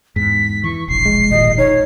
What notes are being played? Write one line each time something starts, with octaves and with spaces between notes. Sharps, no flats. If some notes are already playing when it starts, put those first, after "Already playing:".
E2 G#2 B6
E3 C#6
E1 A#1 C7
G#3
G#1 A#2 D#5
D#4 C#5